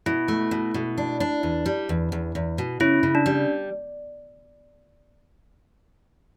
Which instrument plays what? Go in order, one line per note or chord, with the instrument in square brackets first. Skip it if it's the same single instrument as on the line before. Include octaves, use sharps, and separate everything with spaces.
[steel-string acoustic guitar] B2 [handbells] E4
[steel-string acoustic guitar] A3
B2
B2
D4
D4
E2
G3
E2
E2
E2
B2
[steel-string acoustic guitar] C#3 [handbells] E4
[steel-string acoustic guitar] C#3
[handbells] D4
[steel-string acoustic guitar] G3